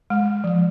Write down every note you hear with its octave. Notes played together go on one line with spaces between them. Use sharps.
G#3
F3